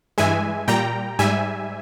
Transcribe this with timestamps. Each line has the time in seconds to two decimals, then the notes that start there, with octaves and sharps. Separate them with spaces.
0.18 G2 E3 G#3 E5 G#5
0.68 A#2 G3 G5 A#5
1.19 G#2 G3 E5 G#5